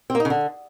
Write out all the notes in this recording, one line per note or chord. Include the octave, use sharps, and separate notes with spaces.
C4
A#3
D#4
C#3
D3